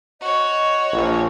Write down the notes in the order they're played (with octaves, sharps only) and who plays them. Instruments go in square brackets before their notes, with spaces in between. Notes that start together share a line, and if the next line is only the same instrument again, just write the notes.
[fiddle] F#4 C#5 [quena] D#5
[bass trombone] A#1